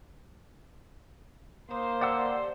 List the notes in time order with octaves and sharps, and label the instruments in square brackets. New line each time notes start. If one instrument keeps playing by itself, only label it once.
[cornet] A#3 [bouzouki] D#4 [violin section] C5
[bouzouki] D3 G4 [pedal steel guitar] D5 F#5 E6